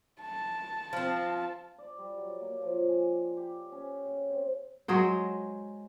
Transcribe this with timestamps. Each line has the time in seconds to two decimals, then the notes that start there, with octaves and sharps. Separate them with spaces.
0.21 A5
0.93 F3 C4
1.78 D5
1.98 G3
2.18 F#3
2.41 A#3
2.62 F3
2.89 G#5
3.37 G4
3.72 C#4
4.05 C#3
4.30 C4
4.88 F#3 G#3 G#4 C5